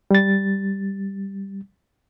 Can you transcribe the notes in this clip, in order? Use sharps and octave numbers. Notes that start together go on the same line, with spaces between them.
G3 A6